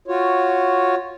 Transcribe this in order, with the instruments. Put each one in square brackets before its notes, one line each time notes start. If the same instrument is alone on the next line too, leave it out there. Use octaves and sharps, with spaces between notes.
[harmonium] F4 F#4 C#5